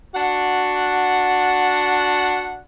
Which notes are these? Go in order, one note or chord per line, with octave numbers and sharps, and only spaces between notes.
D4 F#4 F#5